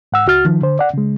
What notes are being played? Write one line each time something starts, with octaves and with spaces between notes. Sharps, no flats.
G#2 F#5 E6
C#2 F#4 F6 A6
D#3 F3
D3 C5
D5 F#5
C#3 G#3